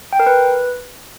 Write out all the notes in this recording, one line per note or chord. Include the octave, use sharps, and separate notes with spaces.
G5
A#4
B4